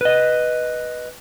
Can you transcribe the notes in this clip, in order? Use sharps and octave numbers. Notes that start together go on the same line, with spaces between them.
B4 D#5